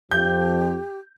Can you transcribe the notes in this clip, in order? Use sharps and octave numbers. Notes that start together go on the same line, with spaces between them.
F2 F3 G4 G6